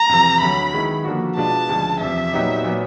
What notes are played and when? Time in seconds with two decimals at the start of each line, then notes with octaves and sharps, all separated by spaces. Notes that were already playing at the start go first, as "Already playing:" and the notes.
Already playing: A#5
0.09 F2 C3 E3
0.41 D2 D3 F#3 B5
0.73 D#3 G#3 B3 E4
1.04 D3 F3 A#3 D4 F#4
1.37 B2 G#3 B3 D4 F4 A5
1.69 D2 C#3 F3 G#3
2.01 E2 C3 F3 E5
2.33 A#2 F#3 B3 D#4 G4
2.64 A#2 F#3 B3